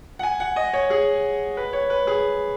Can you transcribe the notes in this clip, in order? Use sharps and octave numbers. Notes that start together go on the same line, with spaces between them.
F#5
G#5
F#5
D#5
C#5
G#4
B4
C#5
B4
G#4